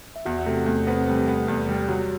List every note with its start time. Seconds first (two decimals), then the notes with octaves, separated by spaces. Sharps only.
0.16 E5
0.25 E2 F#4 F#5
0.46 C3 A3 A4
0.66 E2 A3 A4
0.87 B3 C4 C5
1.07 G3 A3 A4
1.28 B3
1.48 E2
1.69 G3
1.89 F#3 F#4